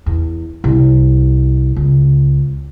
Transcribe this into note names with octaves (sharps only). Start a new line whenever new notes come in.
E2
C2
C#2